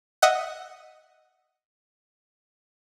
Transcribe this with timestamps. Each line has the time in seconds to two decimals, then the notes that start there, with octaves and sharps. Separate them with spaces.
0.22 D#5 E5 F#5 F#6